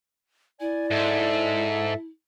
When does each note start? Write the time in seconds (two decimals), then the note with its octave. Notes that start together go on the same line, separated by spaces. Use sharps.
0.60 E4 D5 G#5
0.91 G#2 A4 E5